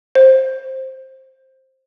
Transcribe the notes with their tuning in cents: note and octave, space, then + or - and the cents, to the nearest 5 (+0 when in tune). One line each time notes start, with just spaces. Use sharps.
C5 +10